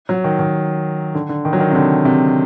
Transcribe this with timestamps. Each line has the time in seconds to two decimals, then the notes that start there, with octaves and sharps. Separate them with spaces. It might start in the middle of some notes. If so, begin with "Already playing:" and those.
0.09 F#3
0.24 D#3
0.39 D#3
1.15 D3
1.29 D3
1.45 D#3
1.53 F#3
1.60 D#3
1.71 C3
1.75 D3
2.05 C3